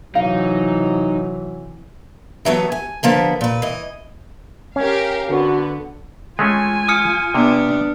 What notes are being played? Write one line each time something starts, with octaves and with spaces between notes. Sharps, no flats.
C3 E3 F#3 D#4 F5
E3 F#3 A3 B3
G#5
D3 F3 A#3 B3
A#2 B4
E3 D#5
C#4 G4 A#4 F5
D3 B3 F#4
G#3 A3 C#4 F4 G#5
D#6 F6 C#7
C3 B3 D4